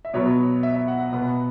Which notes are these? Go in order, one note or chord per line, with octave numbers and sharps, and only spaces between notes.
E5
B2 F#3 B3 C#5
E5
E5
F#5
F#5
B2 B3 F#5